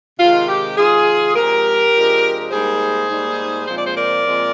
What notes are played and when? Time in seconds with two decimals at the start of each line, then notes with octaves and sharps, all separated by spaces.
0.19 C3 D#3 G#3 F4
0.49 G4
0.77 C3 D#3 G#3 F4 G#4
1.36 C3 F3 G#3 D4 G4 A#4
1.94 C3 F3 G#3 D4
2.51 G#2 G3 A#3 D#4 G#4 C5
3.09 G#2 G3 A#3 D#4
3.67 A#2 F3 G#3 C4 C5
3.76 D5
3.85 G#4 C5
3.96 A#4 D5
4.25 A#2 F3 G#3 C4